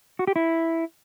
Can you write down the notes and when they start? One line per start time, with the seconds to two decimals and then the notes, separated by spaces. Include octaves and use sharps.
0.19 F#4
0.27 G4
0.36 E4